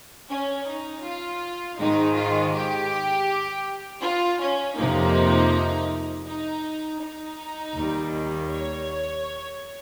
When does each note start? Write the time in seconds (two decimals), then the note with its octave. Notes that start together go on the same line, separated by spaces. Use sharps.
0.29 C#4
0.67 D#4
1.04 F4
1.78 G#2 D#3 G#3 D#4
2.16 F4
2.52 G4
4.02 F4
4.40 C#4
4.76 F2 C3 F3 A#3 D#4
6.26 D#4
7.00 D#4
7.75 D#2 D#3 G3 A#3
8.49 C#5